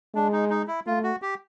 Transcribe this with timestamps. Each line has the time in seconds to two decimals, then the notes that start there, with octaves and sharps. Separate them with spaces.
0.14 G#3 D4
0.32 D#4
0.50 D#4
0.68 E4
0.86 A3 F4
1.03 F#4
1.22 G4